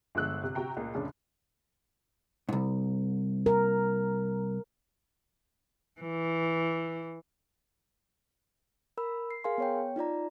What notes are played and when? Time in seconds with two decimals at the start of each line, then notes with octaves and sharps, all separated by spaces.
0.15 G1 D3 F3 G#3 E6 F#6
0.43 C3
0.55 C3 F#4 G5 A#5
0.77 C#2 A#2
0.94 F1 C#2 C#3 D4
2.49 C2 G#2
3.46 A#4
6.00 E3
8.98 A#4 B5 E6
9.31 C7
9.44 G#4 A#4 F5 G#5 C6
9.58 B3 C#5 G5
9.96 D#4 F4 D5 A#5